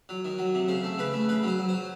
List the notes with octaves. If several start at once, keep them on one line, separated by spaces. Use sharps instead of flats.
F#3
D#3
F#3
C3
C#3 C5
A3
C#3 B4
A3
C#3 B4
F#3
C5
F#3
F#3 C5